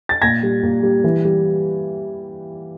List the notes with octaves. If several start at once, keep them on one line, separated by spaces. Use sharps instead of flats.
A6
A#2 G#6 A#6
G3
A#2
G3
E3
G3